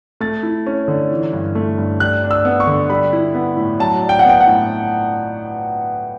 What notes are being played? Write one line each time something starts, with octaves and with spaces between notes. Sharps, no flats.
A3 A6
E4
C#4
D3
E3
G2
A3
G2
G3 F#6
D4
E6
B3
C#6
D3
G3 B5
E4
B3
A2
F#3 A5
D4
G5
F#5
B3 G5
F#5
A2